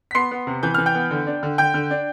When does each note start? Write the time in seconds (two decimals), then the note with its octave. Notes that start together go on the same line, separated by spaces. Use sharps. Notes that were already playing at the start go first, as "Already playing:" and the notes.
0.11 B6
0.15 B3 C6 C7
0.31 B3
0.47 C3
0.63 E3 G6
0.74 E3 F6
0.86 G5 G6
0.95 B3
1.11 D3
1.27 D4
1.43 D3
1.58 D3 G5 G6
1.74 D3
1.91 D4